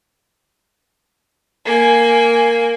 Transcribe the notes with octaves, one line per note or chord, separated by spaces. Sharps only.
A#3 G#5